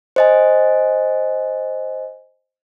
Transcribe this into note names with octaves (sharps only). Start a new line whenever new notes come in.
C5 D#5 G#5